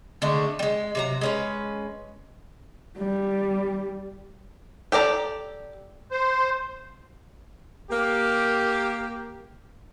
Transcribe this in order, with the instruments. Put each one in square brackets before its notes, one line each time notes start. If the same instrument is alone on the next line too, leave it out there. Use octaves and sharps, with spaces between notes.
[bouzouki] D3 G#3 A3
G3 G#3
C3 F#3 A#5
G#3 C#4 B4
[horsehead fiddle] G3
[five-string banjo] G4 A4 D5 A#5
[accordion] C5
[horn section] A#3 G4